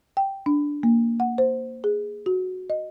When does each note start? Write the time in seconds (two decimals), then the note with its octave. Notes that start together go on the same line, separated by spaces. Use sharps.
0.17 G5
0.46 D4
0.83 A#3
1.20 F#5
1.38 C5
1.84 G#4
2.26 F#4
2.70 D#5